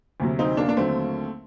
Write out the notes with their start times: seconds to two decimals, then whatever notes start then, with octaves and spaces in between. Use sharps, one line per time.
0.20 D2 C3 F#3
0.39 C4 D#4
0.57 A#3 D4
0.69 D4
0.77 D#2 D3 F#3 A3 C4